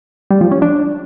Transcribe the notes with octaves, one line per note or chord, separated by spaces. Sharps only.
G3
F3
C#4
D4